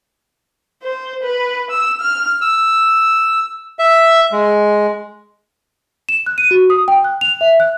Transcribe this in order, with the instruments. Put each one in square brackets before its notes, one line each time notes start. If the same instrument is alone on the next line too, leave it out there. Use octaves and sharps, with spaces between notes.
[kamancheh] C5
B4
E6
F6
[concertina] E6
E5
G#3
[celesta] E7
F#6
D#7
F#4
D#6
G5
F#6
F7
E5
F#6